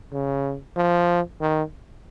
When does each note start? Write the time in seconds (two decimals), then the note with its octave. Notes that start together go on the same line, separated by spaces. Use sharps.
0.12 C#3
0.76 F3
1.41 D#3